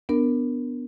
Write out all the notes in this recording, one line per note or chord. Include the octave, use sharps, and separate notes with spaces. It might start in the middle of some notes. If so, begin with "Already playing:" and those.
B3 D4 A#4